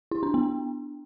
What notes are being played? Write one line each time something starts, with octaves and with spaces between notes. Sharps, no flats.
E4
D4
B3